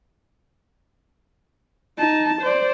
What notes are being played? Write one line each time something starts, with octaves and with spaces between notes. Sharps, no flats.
D#4 A5
C5 D5